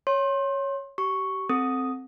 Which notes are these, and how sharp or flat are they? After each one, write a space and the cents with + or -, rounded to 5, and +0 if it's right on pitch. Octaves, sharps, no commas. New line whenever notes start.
C#5 +0 C6 +30
G4 -30 C#6 +0
C4 +0 A4 +0 D#6 +0